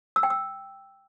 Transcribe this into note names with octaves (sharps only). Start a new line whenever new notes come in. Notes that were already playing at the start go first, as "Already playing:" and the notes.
E6
G5
E6